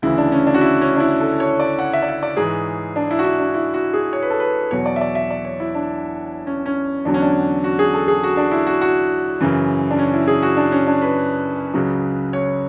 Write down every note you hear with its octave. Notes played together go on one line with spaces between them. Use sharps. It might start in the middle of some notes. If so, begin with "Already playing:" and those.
D2 C#3 E3 E4
D4
C#4
D4
F#4
E4
C#4
D4
E4
A4
C#5
D5
F#5
E5
D5
E5
D5
G#2 E3 G#4
D4
E4
F#4
E4
D4
E4
F#4
G#4
C#5
B4
A4
B4
E2 B2 F#3 C#5
D5
E5
D5
E5
D5
C#5
E4
D4
C#4
C#4
E2 D3 F#3 D4
C#4
D4
F#4
G#4
A4
G#4
F#4
D4
E4
F#4
F#4
F#2 C#3 E3
D4
C#4
E4
G#4
F#4
D4
C#4
D4
B4
C#2 C#3 F#3
C#5